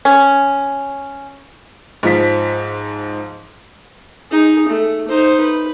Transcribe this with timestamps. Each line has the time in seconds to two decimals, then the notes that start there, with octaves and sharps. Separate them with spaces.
0.05 C#4
2.03 G#2 F3 B6
4.31 D#4 G#4
4.68 A3
5.08 D#4 C5
5.40 B4